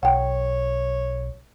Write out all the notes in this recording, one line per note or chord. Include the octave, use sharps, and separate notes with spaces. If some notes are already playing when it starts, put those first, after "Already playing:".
B1 C#5 F#5 G5